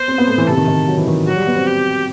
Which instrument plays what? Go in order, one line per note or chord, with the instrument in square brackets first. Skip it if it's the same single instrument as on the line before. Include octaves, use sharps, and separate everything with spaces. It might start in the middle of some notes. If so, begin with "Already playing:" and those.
Already playing: [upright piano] B3 [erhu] C5
[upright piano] C4
B3
A3
E3
[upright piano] C3 [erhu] A4
[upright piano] D#3
D#3
F#3
E3
D#3
[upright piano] F#3 [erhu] F#4
[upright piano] G3
B3
C4
[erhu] G4